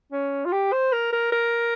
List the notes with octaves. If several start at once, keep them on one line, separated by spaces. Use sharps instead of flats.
C#4
F4
G4
C5
A#4
A#4
A#4